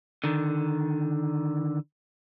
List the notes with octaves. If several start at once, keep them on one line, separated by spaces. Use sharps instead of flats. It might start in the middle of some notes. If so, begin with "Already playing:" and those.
D3 D#3